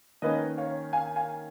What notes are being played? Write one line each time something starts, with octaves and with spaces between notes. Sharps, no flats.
D#3 A#3 C#4 B4 D#5
C#5 F5
F5 G#5
F5 G#5